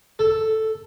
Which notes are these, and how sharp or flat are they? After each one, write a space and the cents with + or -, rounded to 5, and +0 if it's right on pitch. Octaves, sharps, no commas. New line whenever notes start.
A4 +0